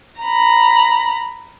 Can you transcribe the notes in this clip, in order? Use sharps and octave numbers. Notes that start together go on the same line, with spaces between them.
A#5 B5